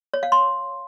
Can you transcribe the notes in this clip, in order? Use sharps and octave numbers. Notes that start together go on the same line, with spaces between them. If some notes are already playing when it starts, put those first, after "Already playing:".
C#5
F5
C6